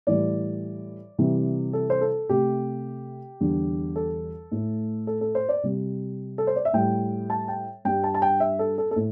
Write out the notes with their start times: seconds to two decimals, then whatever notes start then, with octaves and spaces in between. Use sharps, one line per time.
0.07 A2 E3 G3 D5
1.18 C3 E3 G3
1.73 A4
1.90 C5
2.01 A4
2.29 C3 A3 G4
3.40 E2 D3 G3
3.96 A4
4.52 A2 A3
5.07 A4
5.21 A4
5.35 C5
5.49 D5
5.63 C3 G3
6.38 A4
6.47 C5
6.56 D5
6.65 E5
6.73 A2 G3 G5
7.30 A5
7.48 G5
7.85 G2 G3 G5
8.04 A5
8.14 A5
8.22 G5
8.40 E5
8.59 A4
8.78 A4
8.91 A4
8.96 A2